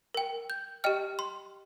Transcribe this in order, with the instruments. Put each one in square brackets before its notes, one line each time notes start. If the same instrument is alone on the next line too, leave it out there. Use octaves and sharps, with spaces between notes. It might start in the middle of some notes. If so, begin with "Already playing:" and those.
[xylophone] A#4 G5
G6
G4 D#5 G5 F6
C6